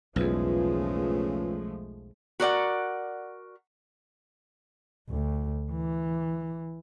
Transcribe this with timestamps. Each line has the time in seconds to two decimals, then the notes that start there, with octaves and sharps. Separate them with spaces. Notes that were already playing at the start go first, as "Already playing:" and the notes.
0.16 B1 E2 C#3 F3 G#3 A3 F4 B4
2.40 F#4 A#4 D5 F#5
5.09 D2
5.72 E3